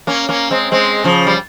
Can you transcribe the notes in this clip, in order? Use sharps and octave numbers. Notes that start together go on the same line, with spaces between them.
A#3 C#4
A#3 C#4
G#3 C4
G#3 C4
C#3 F3
G3